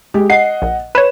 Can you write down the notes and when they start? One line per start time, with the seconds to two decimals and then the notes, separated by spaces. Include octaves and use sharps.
0.14 G#3 G4
0.30 D#5 F#5 C7
0.62 A#1
0.95 B4 C#5 E7